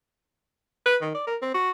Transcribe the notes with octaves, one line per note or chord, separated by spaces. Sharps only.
B4
D#3
D5
A#4
C4
F#4